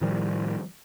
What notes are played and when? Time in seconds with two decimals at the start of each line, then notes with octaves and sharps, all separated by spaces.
0.01 A2 D#3 F3 G3